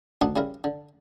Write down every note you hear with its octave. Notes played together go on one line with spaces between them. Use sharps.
D2 D#3 D4 D#4 F#5 C6
C#3 G3 E4 A#4
D3